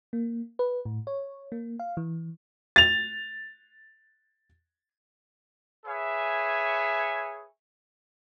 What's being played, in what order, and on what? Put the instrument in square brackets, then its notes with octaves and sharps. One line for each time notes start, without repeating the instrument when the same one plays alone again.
[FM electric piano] A#3
B4
A2
C#5
A#3
F5
E3
[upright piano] A6 F7
[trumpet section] G#4 B4 C#5 E5 G#5